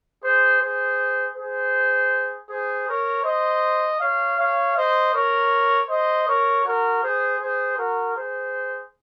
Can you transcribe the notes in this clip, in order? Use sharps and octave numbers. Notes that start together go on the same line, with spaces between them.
G#4 C5
G#4 C5
G#4 C5
G#4 C5
A#4 C#5
C5 D#5
C#5 F5
C#5 F5
C5 D#5
A#4 C#5
C5 D#5
A#4 C#5
F#4 A#4
G#4 C5
G#4 C5
F#4 A#4
G#4 C5